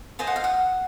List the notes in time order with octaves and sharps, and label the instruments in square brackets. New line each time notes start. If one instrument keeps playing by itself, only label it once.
[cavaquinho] F4 C5 D#5 G#5
F#5
F5
F#5